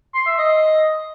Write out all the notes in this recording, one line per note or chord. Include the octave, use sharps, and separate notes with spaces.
C6
E5
D#5